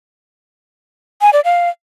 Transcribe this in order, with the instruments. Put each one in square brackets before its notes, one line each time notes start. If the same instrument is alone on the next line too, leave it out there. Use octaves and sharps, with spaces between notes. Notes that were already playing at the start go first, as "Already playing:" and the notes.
[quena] G#5
D5
F5